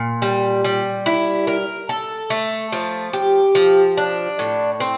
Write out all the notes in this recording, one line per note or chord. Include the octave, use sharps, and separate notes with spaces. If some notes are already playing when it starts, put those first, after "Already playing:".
Already playing: A#2
G3
G3
E4
A#4
A4
A3
F3
G4
F3
D4
A2
C4